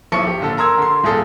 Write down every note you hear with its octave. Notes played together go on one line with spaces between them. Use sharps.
B1 F3 E4 C#6 C#7
G4
A#2 D3 A4
A#4 A#5 C6 E6 G#6
D3 C6
D#1 A#2 G#4 A4